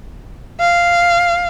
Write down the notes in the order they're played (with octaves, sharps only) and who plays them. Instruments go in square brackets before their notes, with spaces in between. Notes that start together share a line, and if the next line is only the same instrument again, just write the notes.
[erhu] F5